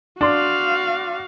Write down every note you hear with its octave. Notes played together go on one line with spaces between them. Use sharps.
D4 F#4 F5 C6